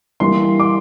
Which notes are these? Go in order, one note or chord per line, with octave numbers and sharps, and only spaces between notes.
E3 G3 A#3 C6
D6